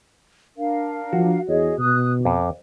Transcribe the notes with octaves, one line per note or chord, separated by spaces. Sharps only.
D4 A#4 F5
F3 F#4
E2 G#4 C#5 D#5
B2 D#6 F#6
F2 D6